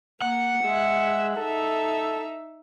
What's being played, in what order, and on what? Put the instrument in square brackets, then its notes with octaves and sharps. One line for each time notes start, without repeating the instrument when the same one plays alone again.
[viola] A#3 [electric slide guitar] F#5
[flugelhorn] G#3 [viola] G#4 E5
[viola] D#4 E5 [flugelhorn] A4